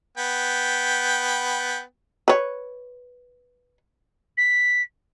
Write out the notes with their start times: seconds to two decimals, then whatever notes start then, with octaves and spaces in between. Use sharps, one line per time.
0.18 B3 G5
2.28 B4 C#5
4.38 B6